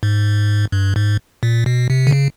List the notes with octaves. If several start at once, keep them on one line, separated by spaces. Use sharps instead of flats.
G#2
G2
G#2
A#2
B2
C3
D3
C#3